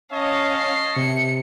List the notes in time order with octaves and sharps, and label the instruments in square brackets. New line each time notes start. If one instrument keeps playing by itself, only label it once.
[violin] C#4 F5 [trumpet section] C#5 D#5 A5
[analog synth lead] C7
[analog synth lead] C3 [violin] C#7